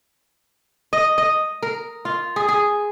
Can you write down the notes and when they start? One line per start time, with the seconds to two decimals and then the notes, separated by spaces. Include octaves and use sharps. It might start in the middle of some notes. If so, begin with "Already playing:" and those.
0.93 D#5
1.18 D#5
1.63 A#4
2.05 F4
2.36 G#4
2.48 G#4